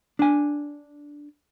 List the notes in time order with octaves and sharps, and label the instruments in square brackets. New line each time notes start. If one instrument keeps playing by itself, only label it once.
[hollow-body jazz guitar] D4 G#5